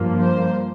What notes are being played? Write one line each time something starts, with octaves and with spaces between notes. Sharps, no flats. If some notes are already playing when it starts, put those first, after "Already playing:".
Already playing: G2 F3 A#3
C5